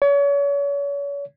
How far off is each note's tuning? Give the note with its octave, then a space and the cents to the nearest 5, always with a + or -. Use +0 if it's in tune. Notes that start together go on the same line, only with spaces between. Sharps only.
C#5 +35